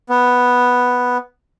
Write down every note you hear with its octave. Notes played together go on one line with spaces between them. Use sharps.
B3